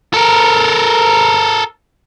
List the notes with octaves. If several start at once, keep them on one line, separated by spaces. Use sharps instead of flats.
A4 A#4